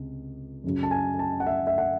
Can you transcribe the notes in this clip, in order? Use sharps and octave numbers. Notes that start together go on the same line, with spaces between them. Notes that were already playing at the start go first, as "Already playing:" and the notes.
Already playing: C#2 C3
F#2 C#3 F#3
A5
G#5
A5
F#5
E5
E5
F#5